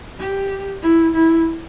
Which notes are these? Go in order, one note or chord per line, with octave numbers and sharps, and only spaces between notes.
G4
E4
E4